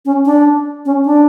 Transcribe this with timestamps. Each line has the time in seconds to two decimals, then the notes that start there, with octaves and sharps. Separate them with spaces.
0.05 C#4
0.26 D4
0.85 C#4
1.05 D4